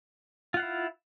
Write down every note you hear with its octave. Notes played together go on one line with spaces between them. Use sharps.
E4 F4 F5 F#5